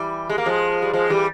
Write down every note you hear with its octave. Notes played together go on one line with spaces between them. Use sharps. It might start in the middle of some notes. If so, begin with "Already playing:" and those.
Already playing: E3 G3
G#3
A#3
F3 G#3
G3
F3 G#3
E3 G3